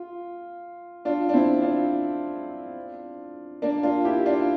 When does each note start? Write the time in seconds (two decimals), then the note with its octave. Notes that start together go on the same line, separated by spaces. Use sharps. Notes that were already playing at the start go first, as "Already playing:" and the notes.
Already playing: F4
1.05 D4 F4
1.29 D4
1.34 C4 E4
1.62 D4 F4
3.62 A#3 D4
3.83 D4 F4
4.05 E4 G4
4.26 D4 F4